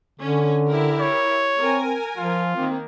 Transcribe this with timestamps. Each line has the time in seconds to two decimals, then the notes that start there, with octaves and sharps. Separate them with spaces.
0.20 D3 C#4
0.68 E4 G4 A#4
1.00 C#5
1.59 C4 A#4 G#5
2.17 F3 F4
2.56 D#3 A#3 C4